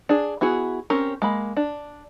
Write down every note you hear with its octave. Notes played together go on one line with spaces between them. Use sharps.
D4 G#4
B3 E4 F#4 G#4
C4 C#4 G4 A#4
G#3 A#3 B5
D4